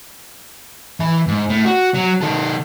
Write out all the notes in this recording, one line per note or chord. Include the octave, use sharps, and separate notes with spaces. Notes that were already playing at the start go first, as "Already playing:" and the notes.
E3 E5
G#2
A2
F#4
F#3
D#3 A4